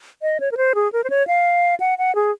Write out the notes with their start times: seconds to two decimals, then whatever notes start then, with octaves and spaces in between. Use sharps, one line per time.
0.22 D#5
0.40 C#5
0.52 A#4
0.57 C5
0.75 G#4
0.93 A#4
1.04 C5
1.10 C#5
1.27 F5
1.80 F#5
1.98 F#5
2.15 G#4